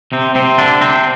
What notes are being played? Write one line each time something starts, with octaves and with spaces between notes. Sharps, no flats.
C3 C4
C3 C4
D3 D4
C3 C4